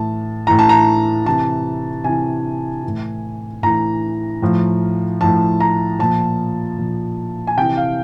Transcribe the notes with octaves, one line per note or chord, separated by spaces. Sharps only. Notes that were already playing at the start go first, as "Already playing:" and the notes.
Already playing: A2 E3 A5
A2 E3 A#5
A5
A#5
C3 E3 A5
C3 E3 G#5
A2 E3
A2 E3 A#5
A2 F3
A2 F3 A5
A#5
A#2 F3 A5
A#2 F3
G#5
C3 E3 G5
F5